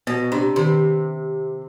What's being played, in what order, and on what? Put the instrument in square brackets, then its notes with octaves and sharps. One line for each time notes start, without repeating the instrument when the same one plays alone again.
[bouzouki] B2 [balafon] B3
[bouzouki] C3 [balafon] D4
[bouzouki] C3 [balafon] D#3